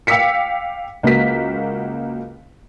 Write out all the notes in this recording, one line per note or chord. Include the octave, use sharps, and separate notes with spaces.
F5 G5 D6 E6 B6 C#7
C#2 A#3 F#4 B6